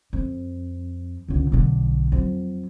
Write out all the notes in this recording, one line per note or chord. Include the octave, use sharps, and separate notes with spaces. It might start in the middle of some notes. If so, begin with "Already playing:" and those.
F2
C#2 D3
B1 D3
F2 F#3